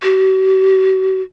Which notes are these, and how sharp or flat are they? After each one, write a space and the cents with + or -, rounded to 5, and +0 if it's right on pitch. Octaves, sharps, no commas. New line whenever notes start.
F#4 +45